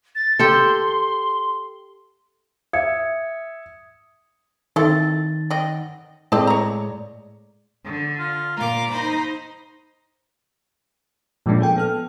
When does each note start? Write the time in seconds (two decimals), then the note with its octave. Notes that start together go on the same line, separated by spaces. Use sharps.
0.15 A6
0.39 G4 A4 C6
2.73 E5 D#6 G#6 C#7
4.76 D#3 C4 E4 A4 A6
5.50 D#5 F#5 G5
6.32 A2 G#3 C4 D5 D#5 A5
6.47 C#5 A#5
7.83 D3
8.18 F4
8.57 A#2 F4 A#5 D6
8.90 D#4 C5 B5
11.46 A#2 F3 G#3 A#3 C#4 D4
11.61 G#4 A4 G5
11.76 B3 A4 F6